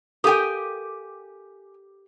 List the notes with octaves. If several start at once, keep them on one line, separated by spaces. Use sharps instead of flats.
G4 A4 A#4 F5 G5 G#5 D#6